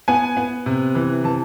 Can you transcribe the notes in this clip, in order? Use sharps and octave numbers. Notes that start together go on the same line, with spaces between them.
B3 G#5
B3
C3
E3
E3 A5